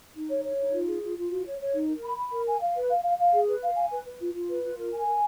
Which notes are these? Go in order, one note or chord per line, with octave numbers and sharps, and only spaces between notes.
D#4
C#5
C#5
D#4
F4
G#4
F4
F4
F#4
C#5
C#5
D#4
A#4
B5
B5
A#4
G#5
F5
B4
F5
F5
F5
G#4
B4
F5
G#5
B4
B4
F4
F4
B4
F4
A#4
G#5
A#4